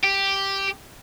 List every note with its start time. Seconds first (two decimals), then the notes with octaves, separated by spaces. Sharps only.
0.04 G4